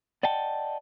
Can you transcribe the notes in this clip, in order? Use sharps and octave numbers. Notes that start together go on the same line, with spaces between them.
D5 D#5 F#5 G5 A5